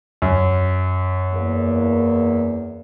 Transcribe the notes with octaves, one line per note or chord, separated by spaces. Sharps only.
F#2
E2 A#3